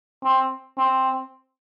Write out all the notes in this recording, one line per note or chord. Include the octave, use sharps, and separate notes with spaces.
C4
C4